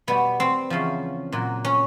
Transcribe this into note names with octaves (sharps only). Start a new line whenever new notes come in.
B2 G3 B3
C4
E2 C#3 F3
A#2 F#3
C#4